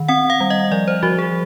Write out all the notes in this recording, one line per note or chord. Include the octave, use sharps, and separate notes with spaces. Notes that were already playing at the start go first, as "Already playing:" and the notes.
Already playing: D#3
C4 F#5
F5
G3
D#5
F3 D5
C5
F3 F#4
G#4